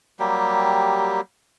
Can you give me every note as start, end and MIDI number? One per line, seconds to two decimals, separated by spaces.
0.19 1.21 54
0.19 1.21 55
0.19 1.21 58
0.19 1.21 67